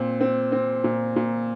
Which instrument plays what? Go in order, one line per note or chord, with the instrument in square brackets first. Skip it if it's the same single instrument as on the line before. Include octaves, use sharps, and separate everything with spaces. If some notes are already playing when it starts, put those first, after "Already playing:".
Already playing: [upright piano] A#2 C4
C4
C4
A#2
A#2